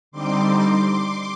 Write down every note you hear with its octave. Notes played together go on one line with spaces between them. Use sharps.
D3 G3 C4 D#4 C6 D6